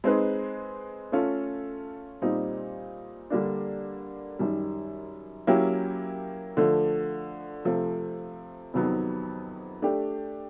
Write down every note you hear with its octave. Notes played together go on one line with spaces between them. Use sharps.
G#3 C4 D#4 G#4 B4
A3 C#4 F4 A4
A#2 G3 C4 D#4
D3 G3 A#3 D4
F#2 D#3 G3
F#3 A#3 C#4 E4 G4
D3 F3 A3
C3 F3 A3
F2 C3 D#3 F#3 B3
A3 D4 G4